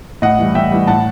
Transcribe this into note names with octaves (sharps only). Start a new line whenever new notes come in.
A2 D#5 F#5
E3 G3
A2 E5 G5
E3 G3
A2 F#5 A5